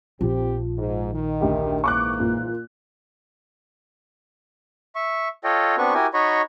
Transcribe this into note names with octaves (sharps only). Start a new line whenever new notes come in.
A#1 F3 C4 G4
G#2
D#3
D2 G4
G#2 E3 A#3 C#6 D6 F#6
A#2
E5 C#6
F4 A4 C#5 D#5 G5
B3 C4 D4 F#4 B4 C#6
E4 F#4 G4 A#4 G5 G#5
D#4 F#4 C#5 D#5 B5 C#6